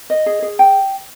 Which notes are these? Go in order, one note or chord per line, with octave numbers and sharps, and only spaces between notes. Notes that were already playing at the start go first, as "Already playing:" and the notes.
D#5
G#4
G#4
G5